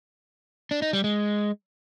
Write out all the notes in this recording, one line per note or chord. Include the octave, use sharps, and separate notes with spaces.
D4
D#4
G3
G#3